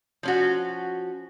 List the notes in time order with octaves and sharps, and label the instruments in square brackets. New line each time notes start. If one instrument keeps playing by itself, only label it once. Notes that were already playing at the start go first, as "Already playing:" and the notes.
[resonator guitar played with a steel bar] F3 C#4 F#4